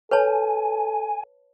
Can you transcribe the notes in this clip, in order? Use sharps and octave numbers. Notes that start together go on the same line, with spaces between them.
A4 B4 C#5 G#5 A5